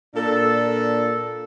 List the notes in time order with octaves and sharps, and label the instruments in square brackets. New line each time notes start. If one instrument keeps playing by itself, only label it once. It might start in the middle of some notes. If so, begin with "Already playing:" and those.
[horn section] A#2 D4 A4